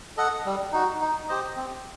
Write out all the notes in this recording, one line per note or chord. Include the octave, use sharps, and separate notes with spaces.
A4 D#5 F#5
G3
D#4 F#4
D#4
G4 C5 D#5
C4